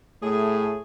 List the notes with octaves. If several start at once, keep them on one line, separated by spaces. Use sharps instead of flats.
A2 A3 G#4